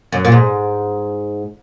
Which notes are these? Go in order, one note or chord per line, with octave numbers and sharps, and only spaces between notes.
F#2
A#2
G#2